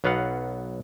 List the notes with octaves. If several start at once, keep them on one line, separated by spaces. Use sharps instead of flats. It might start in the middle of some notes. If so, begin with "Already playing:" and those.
B1 F#3 B3 F5 F#5